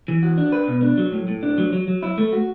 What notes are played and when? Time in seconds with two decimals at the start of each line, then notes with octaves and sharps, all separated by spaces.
0.08 E3
0.23 F#4
0.38 D4
0.52 B4
0.68 B2
0.82 D4
0.98 F#3
1.13 A2
1.28 A2
1.43 D4
1.58 F#3
1.73 F#3
1.88 F#3
2.03 E4
2.18 A3
2.33 F#4